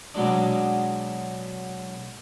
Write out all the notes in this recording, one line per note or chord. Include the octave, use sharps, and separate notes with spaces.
B2 F#3 G#3 D4